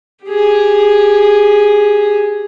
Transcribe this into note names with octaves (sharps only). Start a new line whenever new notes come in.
G4 G#4